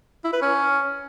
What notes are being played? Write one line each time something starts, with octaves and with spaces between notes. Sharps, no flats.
E4
B4
C#4